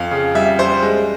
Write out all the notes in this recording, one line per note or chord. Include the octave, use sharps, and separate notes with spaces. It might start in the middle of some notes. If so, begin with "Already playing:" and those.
Already playing: F2 F5
C#3
G3 E5
G3 C5
G#3